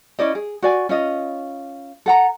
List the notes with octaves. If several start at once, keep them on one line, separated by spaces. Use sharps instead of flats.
C#4 E4 D5 D#5
G#4
F#4 D5 G#5
C#4 F4 D#5
A4 F#5 A#5